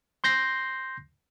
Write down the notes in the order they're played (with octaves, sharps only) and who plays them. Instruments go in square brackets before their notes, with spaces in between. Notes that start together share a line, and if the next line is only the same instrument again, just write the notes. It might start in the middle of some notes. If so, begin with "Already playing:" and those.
[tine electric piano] C6 G6 A#6 C7